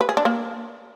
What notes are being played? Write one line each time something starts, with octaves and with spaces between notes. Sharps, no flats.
B4
G#4
D4
A#3